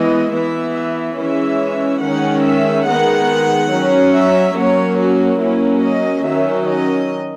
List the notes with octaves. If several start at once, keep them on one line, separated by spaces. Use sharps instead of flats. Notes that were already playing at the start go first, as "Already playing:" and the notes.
Already playing: E3 G#3 B3 D#5
E3 B3 E5
E5
E3 G#3 C#4 E5
D#3 G#3 C#4 F#5
E5
D#3 G#3 B3 F#5
F#3 C#4
E5
F#3 A#3 C#4 C#5
F#4
F#3 A#3 C#4 E4
D#5
D#3 F#3 C#4 E5
D#5